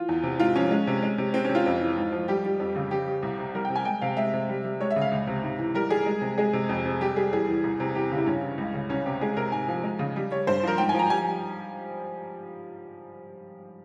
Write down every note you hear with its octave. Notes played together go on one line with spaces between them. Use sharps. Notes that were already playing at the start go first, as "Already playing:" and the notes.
Already playing: E3 F4
E2
C3
G#2 F4
F3 C#4
G#3
C3
G#3
C3
G#3 C4
C3 C#4
F4
F2
E3
G#2
F3
G3 G4
G3
F2
C#3
G3 G4
G3
C2
C3
G3 A#4
G5
C3
G#5
G#3 G5
C3 F5
G#3 E5
C3
G3
G3
G#3 C#5
E5
C#3
F5
C#2
C3
G#2
E3
G3 A#4
G3 G#4
G#3
C3
G#3 G#4
C3
F2
C3
G3 G4
G3 G#4
E2 G#4
E3
C2
C3
E2 G4
C#3
E4
G2 C#4
E3
C#2
C#3
C2 C#4
C3 G4
G#3 G#4
C3 A#4
G#2 G#5
F3
G#3
C#3
G3
G3 C#5
G2 C5
F3 A#4
G#2 G5
G#5
F3 A#5
G3 G#5